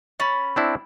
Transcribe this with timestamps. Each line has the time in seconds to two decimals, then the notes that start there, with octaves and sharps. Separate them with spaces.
0.20 C#4 B5 A6
0.56 C4 D4 E4